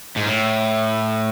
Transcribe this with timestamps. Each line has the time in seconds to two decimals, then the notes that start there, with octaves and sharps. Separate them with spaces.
0.16 G#2
0.26 A2